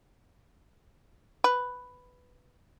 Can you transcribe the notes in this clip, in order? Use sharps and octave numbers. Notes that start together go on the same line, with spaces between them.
B4